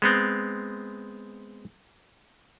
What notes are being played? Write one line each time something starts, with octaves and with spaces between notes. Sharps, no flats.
G#3 B3 C4